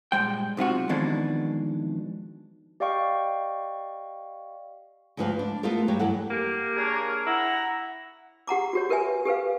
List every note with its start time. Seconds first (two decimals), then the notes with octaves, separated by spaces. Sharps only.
0.12 G2 A#2 G#3 G5
0.57 B1 C3 F4 F#4
0.89 F2 B2 D#3 E3 G#3 D4
2.80 G4 D5 D#5 F5 G5 C#6
5.17 D2 G#2 F3 F#4 B4 F5
5.39 D4
5.63 A3 B3 F4 A4 A#4
5.88 G2 F#3 G4 C#5
5.99 G2 E3 A4 F#5
6.30 A#3 G4
6.76 D4 G#4 A#4 C#5
7.26 E4 F#5 A#5
8.47 G4 F#5 A#5 D6
8.73 F#4 G4 C#5
8.89 G4 A#4 B4 E5 G#5
9.25 G4 A4 B4 F5